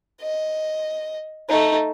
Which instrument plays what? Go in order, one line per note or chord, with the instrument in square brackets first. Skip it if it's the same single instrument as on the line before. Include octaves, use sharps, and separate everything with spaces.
[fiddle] D#5
A3 D#4